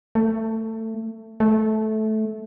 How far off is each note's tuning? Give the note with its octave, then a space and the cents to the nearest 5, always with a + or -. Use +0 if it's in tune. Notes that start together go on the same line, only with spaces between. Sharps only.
A3 +20
A3 -15